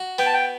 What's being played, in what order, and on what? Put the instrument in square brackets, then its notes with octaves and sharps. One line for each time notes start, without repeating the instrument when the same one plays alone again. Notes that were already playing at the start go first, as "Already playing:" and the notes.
Already playing: [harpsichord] F#4
[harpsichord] B3 [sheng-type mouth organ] G5
[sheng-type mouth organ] A5
G5